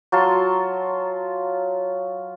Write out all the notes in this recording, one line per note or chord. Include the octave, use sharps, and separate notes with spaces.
F#3 F4 A5 C6